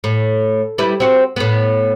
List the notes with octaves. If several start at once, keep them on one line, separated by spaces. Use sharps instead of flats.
A2
G3 E4 B4
C4 F#4
A2 B3